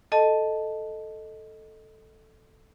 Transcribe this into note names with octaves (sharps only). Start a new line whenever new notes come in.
A4 D#5 A5